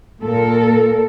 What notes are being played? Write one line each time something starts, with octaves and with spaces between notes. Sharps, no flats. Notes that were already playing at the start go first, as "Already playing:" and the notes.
A#2 A4 A#4